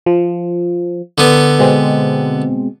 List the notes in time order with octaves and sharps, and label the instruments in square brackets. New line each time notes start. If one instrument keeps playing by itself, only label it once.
[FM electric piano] F3
[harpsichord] D3 B3
[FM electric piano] B2 G#3 C4